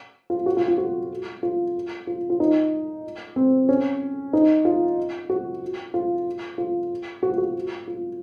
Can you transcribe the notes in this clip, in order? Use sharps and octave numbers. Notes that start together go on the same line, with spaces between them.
F4
F#4
F4
F4
F#4
F4
F4
F4
D#4
C4
C#4
D#4
F4
F#4
F4
F4
F#4
F4
F#4
F4